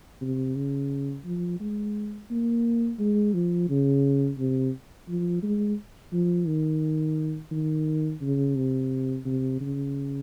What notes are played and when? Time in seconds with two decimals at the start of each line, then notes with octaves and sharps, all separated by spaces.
0.21 C3
0.56 C#3
1.25 F3
1.60 G#3
2.30 A#3
2.99 G#3
3.34 F3
3.69 C#3
4.39 C3
5.09 F3
5.43 G#3
6.12 F3
6.47 D#3
7.51 D#3
8.21 C#3
8.56 C3
9.25 C3
9.61 C#3